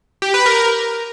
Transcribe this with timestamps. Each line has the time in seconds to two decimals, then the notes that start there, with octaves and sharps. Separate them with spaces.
0.22 G4
0.34 B4
0.46 A#4